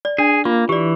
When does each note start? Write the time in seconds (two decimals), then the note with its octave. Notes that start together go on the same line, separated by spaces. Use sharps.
0.05 D5
0.18 D4 G#4
0.45 A#3 F4
0.69 E3 G4 D5